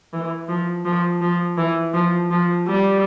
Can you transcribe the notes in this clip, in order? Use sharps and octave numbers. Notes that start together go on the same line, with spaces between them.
E3
F3
F3
F3
E3
F3
F3
G3